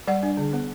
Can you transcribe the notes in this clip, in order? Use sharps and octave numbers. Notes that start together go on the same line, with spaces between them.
G3 D5 F#5
D4
D3
B3